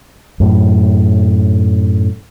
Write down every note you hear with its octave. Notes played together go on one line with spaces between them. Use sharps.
F#2 A2